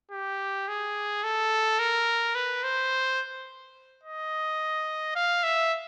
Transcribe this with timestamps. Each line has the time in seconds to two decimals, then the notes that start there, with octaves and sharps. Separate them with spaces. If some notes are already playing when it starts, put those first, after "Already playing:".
0.11 G4
0.68 G#4
1.24 A4
1.79 A#4
2.35 B4
2.64 C5
4.04 D#5
5.15 F5
5.44 E5